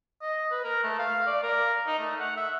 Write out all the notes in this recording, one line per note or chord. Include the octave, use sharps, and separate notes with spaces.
D#5
B4
A#4
A3
F5
D5
A#4
D#4
A3
F#5
E5